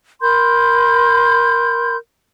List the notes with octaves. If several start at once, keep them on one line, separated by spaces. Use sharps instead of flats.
A#4 B5 C6 G6